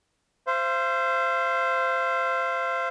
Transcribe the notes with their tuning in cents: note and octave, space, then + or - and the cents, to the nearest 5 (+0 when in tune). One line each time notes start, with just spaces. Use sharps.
C5 +0 F5 -45